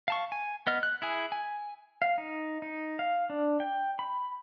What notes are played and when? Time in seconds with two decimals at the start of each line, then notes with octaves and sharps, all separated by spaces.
0.08 F5 A5 C#6
0.32 G#5
0.67 B3 D#5 F6
0.83 F#6
1.02 E4 G#4 G#5
1.32 G#5
2.02 F5
2.18 D#4
2.62 D#4
2.99 F5
3.30 D4
3.60 G5
3.99 B5